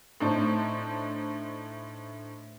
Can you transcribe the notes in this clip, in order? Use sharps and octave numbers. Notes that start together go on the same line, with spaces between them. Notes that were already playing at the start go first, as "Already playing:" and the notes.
A2 D4 D#4 C5